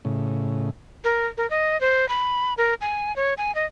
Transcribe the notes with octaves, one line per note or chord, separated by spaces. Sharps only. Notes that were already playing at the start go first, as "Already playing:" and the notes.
A2 C#3
A#4
A#4
D#5
C5
B5
A#4
G#5
C#5
G#5
D#5